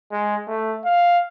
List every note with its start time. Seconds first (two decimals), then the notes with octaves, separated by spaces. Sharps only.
0.12 G#3
0.47 A3
0.85 F5